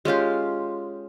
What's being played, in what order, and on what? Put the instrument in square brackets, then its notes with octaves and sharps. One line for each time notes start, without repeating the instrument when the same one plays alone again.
[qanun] G#3 C#4 F4 G4